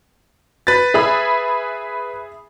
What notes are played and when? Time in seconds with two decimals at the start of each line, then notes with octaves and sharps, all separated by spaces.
0.67 B4 A6
0.94 G#4 E5 B5